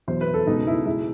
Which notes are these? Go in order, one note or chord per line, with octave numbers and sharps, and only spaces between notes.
E2 B2 F#3 C5
B4
A4
C#2 B2 G#3 D#4
E4
B2 G#3 E4